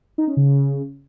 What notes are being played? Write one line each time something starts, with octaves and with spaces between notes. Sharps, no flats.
D#4
C#4
C#3